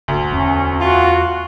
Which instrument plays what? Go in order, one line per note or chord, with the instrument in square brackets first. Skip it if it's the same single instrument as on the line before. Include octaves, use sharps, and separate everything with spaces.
[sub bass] E1 [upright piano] D2
[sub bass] E2 [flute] C#4
[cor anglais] F4 [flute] F#4